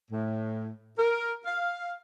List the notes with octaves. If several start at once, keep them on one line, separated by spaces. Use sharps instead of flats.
A2
A#4
F5